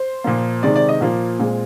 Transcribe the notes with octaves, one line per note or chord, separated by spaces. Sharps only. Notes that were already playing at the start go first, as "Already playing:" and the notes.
Already playing: C5
A#2 F3 A#3
C3 D#3 G#3 C4 D5
D5
D#5
A#2 F3 A#3
A#2 G#3 C4